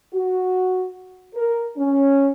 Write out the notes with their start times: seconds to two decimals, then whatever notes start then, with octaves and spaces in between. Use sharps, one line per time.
0.14 F#4
1.34 A#4
1.77 C#4